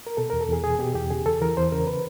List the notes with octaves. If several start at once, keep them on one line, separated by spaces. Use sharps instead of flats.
A#4
B2 A4
E2 A#4
A4
E2 G#4
B2 G#4
B2 G4
E2 G4
C#3 G#4
E2 A4
E3 A#4
E2 C5
C#3 A#4
B4